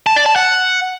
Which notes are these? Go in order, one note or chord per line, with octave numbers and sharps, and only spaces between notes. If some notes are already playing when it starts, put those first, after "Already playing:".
A5
D5
A5
F#5